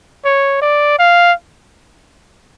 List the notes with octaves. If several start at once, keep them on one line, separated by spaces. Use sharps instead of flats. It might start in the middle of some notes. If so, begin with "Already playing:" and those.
C#5
D5
F5